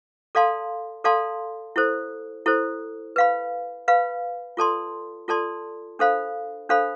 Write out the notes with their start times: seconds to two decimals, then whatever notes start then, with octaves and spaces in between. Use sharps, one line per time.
0.35 A4 D5 F5 A5 C6
1.04 A4 D5 F5 A5 C6
1.76 E4 A4 C5
2.46 E4 A4 C5
3.16 B4 F5 B5
3.88 B4 F5 B5
4.57 F4 A4 D5 A5 C6
5.28 F4 A4 D5 A5 C6
5.99 D4 A4 C5 F5 B5
6.69 D4 A4 C5 F5 B5